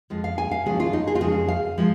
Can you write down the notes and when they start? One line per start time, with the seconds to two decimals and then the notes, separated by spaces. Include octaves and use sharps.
0.10 F2 F3 G#3
0.24 F5
0.38 G#5
0.51 F5
0.66 D#2 C#3 F3 G#3 G#4
0.80 F4
0.93 D#4
1.07 G#4
1.15 F4
1.21 F2 C#3 G#3 G#4
1.48 F5
1.78 F3 G#3